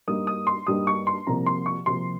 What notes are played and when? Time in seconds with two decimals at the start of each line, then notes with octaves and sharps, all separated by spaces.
0.08 G2 G3 A#3 D#4 D#6
0.27 D#6
0.47 C6
0.67 G2 G3 A#3 D#4 D#6
0.87 C#6
1.07 C6
1.27 C2 C3 F3 A#3 A#5
1.46 C6
1.66 C#6
1.86 C2 C3 F3 A#3 C6